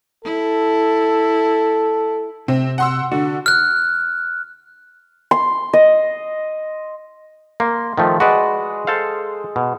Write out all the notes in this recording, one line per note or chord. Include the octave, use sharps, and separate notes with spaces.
E4 A4
C3 C4
F#5 C6 E6
D3 F#4
F6 F#6
C6
D#5
A#3 C6
D#3 F3 A3
G#3 F#4 B4 D5
A4 C5 F5
B2